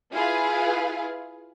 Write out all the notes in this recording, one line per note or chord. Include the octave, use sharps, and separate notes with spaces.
E4 F4 G#4 B4 F5